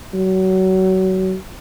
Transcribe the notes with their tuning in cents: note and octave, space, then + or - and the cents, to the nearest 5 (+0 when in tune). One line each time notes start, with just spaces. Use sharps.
F#3 +25